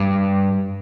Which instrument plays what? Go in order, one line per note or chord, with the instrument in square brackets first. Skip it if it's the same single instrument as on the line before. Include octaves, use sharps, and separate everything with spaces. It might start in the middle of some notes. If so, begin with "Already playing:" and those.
Already playing: [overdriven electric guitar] G2